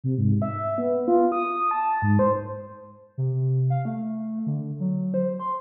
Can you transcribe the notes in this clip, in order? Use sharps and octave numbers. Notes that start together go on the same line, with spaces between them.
C3
G#2
E5
B3
F4
D#6
A5
G#2
C5
C3
F5
A3
D3
F#3
C5
C6